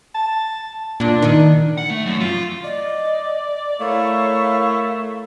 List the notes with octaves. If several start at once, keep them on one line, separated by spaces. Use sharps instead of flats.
A5
A#2 D4
D#3
F#5
A3
F#2
F4
D5 D#5
A3 E4 A#4 C#5 F5